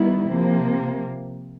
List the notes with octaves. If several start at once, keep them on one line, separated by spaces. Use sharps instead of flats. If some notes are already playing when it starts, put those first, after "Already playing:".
Already playing: D#3 G3 B3 E4
C3 F3 A#3